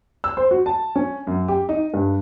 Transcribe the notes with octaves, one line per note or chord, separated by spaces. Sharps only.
E6
C5
F#4
A5
C#4
F#2
G4
D#4
G2